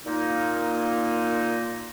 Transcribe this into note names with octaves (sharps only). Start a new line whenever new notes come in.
A#2 A#3 D#4